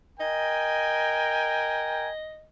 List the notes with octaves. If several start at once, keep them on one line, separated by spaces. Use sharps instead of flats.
A#4 D#5 G5 G#5